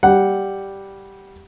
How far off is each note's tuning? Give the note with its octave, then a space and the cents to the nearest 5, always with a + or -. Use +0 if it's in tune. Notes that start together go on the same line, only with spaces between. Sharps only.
G3 -5 F#5 +0